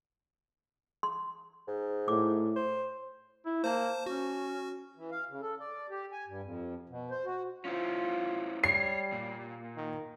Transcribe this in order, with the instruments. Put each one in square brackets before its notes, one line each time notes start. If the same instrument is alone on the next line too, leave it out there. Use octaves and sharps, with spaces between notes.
[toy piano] C6
[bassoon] G#2
[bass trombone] A2 [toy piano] D6
[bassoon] C5
[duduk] E4
[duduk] A#3 [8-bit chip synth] C5 A5
[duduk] C#4 [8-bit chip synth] F#4
[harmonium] E3
F5
C#3
A4
D5
G4
G#5
G2
F2
B2
C5
F#4
[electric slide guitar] C#4 E4 C5 [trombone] F4
[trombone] G3 [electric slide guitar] C#5 [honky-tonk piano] C7
[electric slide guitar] A#2
[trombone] D#3